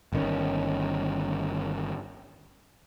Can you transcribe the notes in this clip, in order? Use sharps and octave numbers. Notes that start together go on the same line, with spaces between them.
G1 D#3 C#4